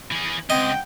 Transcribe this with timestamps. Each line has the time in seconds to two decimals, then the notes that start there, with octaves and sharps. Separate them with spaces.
0.12 E3 G#4
0.50 C#2 C4 D#5 F#5 G5